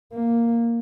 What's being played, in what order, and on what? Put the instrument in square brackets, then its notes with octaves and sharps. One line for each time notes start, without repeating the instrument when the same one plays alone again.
[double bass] A#3